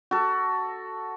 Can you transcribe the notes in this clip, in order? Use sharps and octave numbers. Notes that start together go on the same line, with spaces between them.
F#4 A4